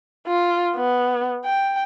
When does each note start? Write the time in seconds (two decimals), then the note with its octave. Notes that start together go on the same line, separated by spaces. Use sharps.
0.27 F4
0.76 B3
1.45 G5